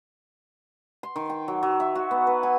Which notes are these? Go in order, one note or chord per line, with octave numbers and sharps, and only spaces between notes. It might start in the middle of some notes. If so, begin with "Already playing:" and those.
C6
D#3
G5
F#3
F#3
E5
F#4
B3
B4
G#5